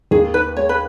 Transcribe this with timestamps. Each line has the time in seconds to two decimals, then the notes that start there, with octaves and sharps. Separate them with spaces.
0.11 D#2 G#4
0.34 D#3 B4
0.56 G#3 C#5
0.69 B4